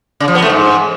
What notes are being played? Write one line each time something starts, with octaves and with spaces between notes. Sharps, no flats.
C#3
F3
B3
A3
G#2